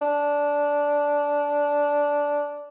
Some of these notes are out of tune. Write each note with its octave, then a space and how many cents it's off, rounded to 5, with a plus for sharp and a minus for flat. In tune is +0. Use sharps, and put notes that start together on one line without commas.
D4 -10